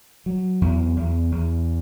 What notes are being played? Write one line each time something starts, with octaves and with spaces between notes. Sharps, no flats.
F#3
E2
E2
E2